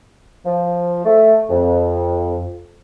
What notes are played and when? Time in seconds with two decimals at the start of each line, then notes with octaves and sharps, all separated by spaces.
0.45 F3
1.05 A3
1.50 F2